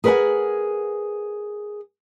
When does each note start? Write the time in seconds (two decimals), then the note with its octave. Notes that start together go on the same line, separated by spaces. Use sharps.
0.04 G#4 A#4 B4 D5 F#5 G#5